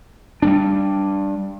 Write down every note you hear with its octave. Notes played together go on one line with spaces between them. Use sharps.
G3 G#3 D4